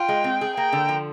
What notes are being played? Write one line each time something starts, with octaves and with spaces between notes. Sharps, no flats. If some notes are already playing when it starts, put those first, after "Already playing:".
Already playing: F4 G5
G#3
C4
G#4
A#3 G5
D3
F3